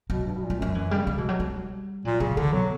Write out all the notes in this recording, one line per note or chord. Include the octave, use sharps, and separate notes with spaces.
B2 F#3
G2
B2
A#2
G3
F#2 F#3
F#2 E3
G3
C#3
G3
B2 E3
F#3
G3
A#2 F#3
C#3 F#3
D3 E3
B2 F#3